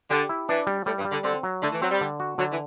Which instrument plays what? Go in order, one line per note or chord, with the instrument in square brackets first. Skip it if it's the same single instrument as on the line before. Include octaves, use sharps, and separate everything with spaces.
[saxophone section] D3 [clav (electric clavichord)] G4
[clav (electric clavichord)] E4
[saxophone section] E3 [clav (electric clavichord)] D4
[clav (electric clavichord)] G3
[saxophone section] A2 [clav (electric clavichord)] G3
[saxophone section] G2
[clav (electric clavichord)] G3
[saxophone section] D3
[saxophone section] D3 [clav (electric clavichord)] C4
[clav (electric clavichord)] F#3
[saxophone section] D3 [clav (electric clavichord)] A3
[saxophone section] E3
[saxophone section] F#3 [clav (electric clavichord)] C4
[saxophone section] G3
[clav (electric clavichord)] D3
F#4
[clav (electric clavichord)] D3 [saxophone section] F#3
[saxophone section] E3